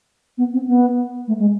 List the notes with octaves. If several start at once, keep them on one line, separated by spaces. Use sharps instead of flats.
B3
C4
B3
A3
G#3